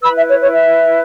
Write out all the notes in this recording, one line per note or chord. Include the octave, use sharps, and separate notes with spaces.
E4 B4 B5 E6
E5
C#5
C#5
E5